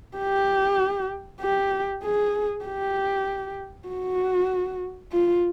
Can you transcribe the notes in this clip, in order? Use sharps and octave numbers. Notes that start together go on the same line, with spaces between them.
G4
G4
G#4
G4
F#4
F4